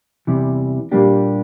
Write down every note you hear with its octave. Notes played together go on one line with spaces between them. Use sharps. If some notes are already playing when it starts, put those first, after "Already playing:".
E2 C3 E3 G3
A#2 G3 A#3 D4 G4